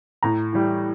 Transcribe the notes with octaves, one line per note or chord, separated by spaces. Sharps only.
A2 A#5
E3 G3